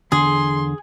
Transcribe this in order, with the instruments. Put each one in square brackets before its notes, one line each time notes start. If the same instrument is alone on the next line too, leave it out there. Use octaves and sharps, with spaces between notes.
[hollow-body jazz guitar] E2 D3 [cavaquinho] G#4 [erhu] C6